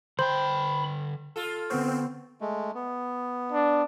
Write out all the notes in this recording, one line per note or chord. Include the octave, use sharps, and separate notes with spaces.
D3 C5 G5 B5
F4 A4
D3 B3 C4 C#6
G#3 A3
B3
D4